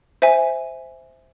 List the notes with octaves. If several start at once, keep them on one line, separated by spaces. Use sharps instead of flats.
C5 E5 G#5